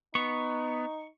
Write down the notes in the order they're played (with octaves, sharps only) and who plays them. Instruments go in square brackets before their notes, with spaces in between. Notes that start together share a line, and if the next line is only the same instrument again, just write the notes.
[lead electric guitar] B3 [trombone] D#4 [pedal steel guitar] C#6